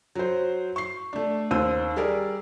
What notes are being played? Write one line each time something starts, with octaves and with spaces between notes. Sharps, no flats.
F#3 C5
C#6 C7
A3 D4
D#2 C5 E6 D#7
G3 G#4 A#4 D5